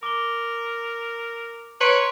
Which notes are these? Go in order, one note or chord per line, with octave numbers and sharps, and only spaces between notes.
A#4 D6 G7
B4 C#5 A#5 C6 D7